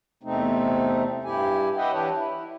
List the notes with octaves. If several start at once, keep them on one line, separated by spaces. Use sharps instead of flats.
E2 C3 A3 C4 D#4
G2 E4 G4 G#5
G4 B4 D#5 E5 F#5 G5
E3 D4 E4 G4 B4 C#5
E4